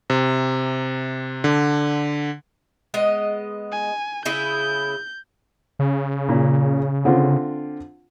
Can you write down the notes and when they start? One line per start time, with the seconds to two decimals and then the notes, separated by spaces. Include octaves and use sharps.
0.10 C3
1.44 D3
2.94 G#3 B3 D#5
3.72 G#5
4.25 C#3 E4 G#4 G6
5.79 C#3
6.29 A#2
7.05 D3 C4 F4